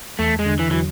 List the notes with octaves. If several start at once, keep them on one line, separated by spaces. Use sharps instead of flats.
E2 A3
G#3
D3
E3
E3 F#3